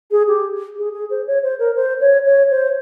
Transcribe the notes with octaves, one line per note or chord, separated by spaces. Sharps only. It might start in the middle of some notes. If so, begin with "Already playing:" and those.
G#4
G4
G#4
G#4
C5
C#5
C5
A#4
C5
C#5
C#5
C5